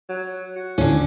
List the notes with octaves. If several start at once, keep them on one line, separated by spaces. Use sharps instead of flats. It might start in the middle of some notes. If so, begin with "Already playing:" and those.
F#3
F#4
D#2 A2 D3 C#4